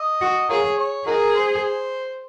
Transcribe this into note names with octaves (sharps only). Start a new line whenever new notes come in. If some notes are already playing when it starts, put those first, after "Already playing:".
Already playing: D#5
F#4
F4 G#4 A#4 C#5
C#5
D#4 F#4 G#4 A#4
C5